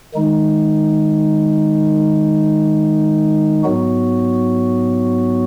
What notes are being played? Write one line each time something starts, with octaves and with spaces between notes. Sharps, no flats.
D#3 G#3 D#4
G#2 F#3 B3 F#4